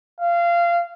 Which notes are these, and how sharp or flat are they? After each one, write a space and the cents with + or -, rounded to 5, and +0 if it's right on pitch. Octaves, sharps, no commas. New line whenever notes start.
F5 -20